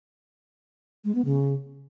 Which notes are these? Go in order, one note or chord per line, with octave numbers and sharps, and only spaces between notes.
G#3
B3
C#3